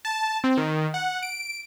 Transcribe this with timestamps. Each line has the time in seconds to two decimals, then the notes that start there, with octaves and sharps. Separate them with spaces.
0.05 A5
0.44 C4
0.57 D#3
0.94 F#5
1.23 D7